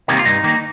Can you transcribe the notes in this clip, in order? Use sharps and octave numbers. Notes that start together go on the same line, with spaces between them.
C3 D#3 G3 A#3
F4
G2 D#4
D#3 A#3